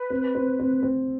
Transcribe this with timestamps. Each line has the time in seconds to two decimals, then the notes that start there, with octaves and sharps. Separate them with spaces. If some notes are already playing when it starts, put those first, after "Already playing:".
Already playing: B4
0.10 C4
0.35 C4
0.60 C4
0.83 C4